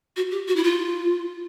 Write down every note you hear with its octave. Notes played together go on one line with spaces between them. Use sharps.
F#4
G4
F#4
E4
F4